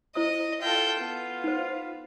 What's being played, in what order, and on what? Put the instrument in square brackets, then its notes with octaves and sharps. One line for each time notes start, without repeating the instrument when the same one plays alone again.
[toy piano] E4 C5 D#6 [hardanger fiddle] D#5
[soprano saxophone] F4 [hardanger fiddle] A4 G5
[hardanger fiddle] B3
[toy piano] D#4 C5